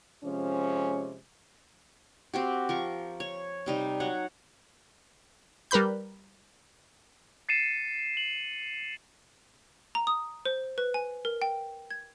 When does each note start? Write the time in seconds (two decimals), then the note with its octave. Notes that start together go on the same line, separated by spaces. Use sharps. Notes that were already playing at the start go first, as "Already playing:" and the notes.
0.24 C3 F3 G#3 C#4
2.34 C4 F#4 G4
2.69 F3 A#4 C#6
3.20 C#5
3.66 C3 G3 D#4
4.00 F#3 C#5 F#5
5.71 G3 A#4 B4 B5 G6
7.49 A6 C7 C#7 D#7 E7
8.17 F#7
9.95 A#5
10.07 D#6
10.46 C5
10.78 B4
10.94 G#5
11.25 A#4
11.42 G5
11.90 G#6